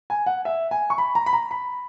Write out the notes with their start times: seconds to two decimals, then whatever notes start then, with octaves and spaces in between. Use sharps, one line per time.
0.10 G#5
0.26 F#5
0.45 E5
0.71 G#5
0.90 C#6
0.98 B5
1.15 A#5
1.26 B5
1.33 A#5
1.51 B5